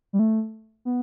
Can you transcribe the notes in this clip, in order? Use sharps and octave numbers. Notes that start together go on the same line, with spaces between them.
G3
A3
B3